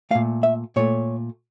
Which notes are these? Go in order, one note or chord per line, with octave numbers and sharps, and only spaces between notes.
A#2 A3 F5
E5
A#2 A3 C#5